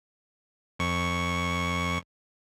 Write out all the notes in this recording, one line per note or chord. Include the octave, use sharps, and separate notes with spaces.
F2 C#6